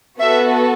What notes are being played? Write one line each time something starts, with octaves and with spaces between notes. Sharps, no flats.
B3 F#4 A4 E5